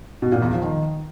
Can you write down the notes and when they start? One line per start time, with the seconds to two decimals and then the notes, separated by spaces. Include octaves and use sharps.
0.22 B2
0.32 A#2
0.42 E2
0.52 F3
0.62 D#3